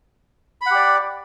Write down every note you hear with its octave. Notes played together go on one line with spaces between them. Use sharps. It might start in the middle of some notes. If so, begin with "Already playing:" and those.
G4 D5 F#5 B5